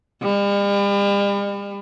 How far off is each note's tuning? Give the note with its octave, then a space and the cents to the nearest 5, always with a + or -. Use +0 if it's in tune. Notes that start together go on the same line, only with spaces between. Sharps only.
G3 +40